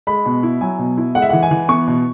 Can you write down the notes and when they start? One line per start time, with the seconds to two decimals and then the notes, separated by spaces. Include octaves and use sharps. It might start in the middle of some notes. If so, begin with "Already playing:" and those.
0.07 G#3 B5
0.26 B2
0.43 E4
0.61 F#3 G#5
0.79 B2
0.97 E4
1.15 G#3 F#5
1.22 E5
1.29 E3 F#5
1.43 G#5
1.51 E3
1.69 B3 C#6
1.88 B2